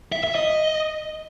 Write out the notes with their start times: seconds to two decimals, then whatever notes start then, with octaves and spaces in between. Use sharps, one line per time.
0.12 E5
0.24 E5
0.35 D#5